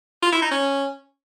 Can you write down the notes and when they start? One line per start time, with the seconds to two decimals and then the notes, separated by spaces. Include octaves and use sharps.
0.22 F4
0.32 E4
0.42 D#4
0.51 C#4